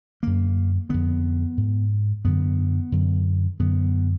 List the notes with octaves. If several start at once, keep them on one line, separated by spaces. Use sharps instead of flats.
F#2 D3 A#3
F2 D3 B3
G#2
F#2 D3 B3
F#2 D3
F#2 D3 B3